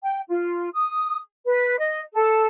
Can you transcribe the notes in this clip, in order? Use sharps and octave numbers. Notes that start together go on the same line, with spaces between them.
G5
F4
D#6
B4
D#5
A4